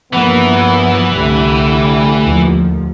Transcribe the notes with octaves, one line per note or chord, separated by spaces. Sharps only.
G2 E3 F3 A#3 B3
C2 D3 G3 A3
D#2 F3